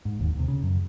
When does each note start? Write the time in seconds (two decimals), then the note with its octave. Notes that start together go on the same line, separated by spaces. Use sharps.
0.05 G#2
0.19 E1 D#2
0.36 D#2 C3
0.48 C#3
0.63 F#2